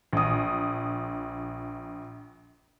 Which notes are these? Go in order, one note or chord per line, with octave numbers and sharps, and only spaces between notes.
A#1 D#6